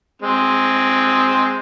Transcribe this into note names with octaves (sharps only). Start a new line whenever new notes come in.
G#3 C4